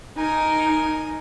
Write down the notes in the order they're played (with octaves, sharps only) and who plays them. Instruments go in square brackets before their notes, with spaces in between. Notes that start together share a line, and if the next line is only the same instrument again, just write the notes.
[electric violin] D#4 [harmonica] A#4 G#5